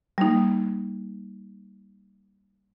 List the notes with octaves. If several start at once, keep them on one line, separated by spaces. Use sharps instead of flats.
G3 A#3 D#4